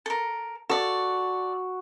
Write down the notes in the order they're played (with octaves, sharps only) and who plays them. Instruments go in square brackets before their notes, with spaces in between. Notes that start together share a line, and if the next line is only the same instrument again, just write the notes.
[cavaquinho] A4 A#4
[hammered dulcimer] F#4 [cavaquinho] A4 D5